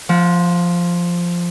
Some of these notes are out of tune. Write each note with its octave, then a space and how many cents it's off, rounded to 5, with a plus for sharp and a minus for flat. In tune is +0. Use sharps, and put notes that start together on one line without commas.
F3 +0 F#5 -35